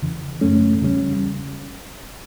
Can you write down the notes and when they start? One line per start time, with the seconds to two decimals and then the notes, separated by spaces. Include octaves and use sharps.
0.02 E2 C#3 E3
0.41 F#2 E3 A3 C#4
0.81 E2 C#3 G3 C#4